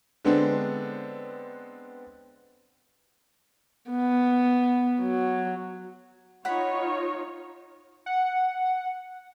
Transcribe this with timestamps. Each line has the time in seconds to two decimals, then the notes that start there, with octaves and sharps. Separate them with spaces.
0.25 D3 G#3 B3 C4 D4
3.90 B3
5.01 F#3
6.45 D#4 F4 C#5 F#5 B5
8.06 F#5